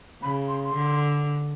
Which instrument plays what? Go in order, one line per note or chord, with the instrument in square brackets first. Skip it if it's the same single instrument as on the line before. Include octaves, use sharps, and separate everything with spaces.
[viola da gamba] C#3 [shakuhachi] B5
[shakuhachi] C6
C6
[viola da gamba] D3